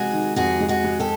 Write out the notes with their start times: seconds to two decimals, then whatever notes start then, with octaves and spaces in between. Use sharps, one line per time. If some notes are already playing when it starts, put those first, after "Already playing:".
Already playing: C3 G#3 F#4 G#4
0.13 D#3
0.36 F2 F#4 G#4
0.60 G#3
0.68 F#4 G#4
0.84 G#3
1.00 G4 A4